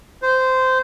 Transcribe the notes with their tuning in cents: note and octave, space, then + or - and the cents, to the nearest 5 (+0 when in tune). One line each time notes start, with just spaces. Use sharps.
C5 -15